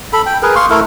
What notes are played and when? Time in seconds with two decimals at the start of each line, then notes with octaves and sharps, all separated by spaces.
0.13 A4 B5
0.26 G5
0.43 G#4 A#4 B4
0.56 F5 C6 C#6
0.70 A3 E4 A4 A#4